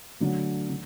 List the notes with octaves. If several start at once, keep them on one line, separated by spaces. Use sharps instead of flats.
D3 F#3 A3
D3